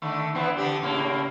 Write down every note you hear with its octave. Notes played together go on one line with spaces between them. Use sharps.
D3 D#3 A3
E3 B3 C4
D3 D4 G4
A2 C#3 A#3